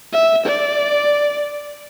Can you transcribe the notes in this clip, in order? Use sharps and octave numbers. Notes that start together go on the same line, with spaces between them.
E5
D5